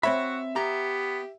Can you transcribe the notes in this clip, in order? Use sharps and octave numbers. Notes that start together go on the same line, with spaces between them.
C4 F#4 C#5 E5 B5
B3 G4 A#5